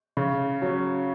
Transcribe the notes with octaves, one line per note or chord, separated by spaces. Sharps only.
C#3
F#3 C#4